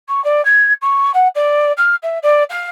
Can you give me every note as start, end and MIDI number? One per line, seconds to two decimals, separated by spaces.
0.08 0.23 85
0.24 0.44 74
0.45 0.73 92
0.82 1.11 85
1.14 1.27 78
1.35 1.72 74
1.77 1.95 89
2.02 2.18 76
2.23 2.43 74
2.50 2.70 77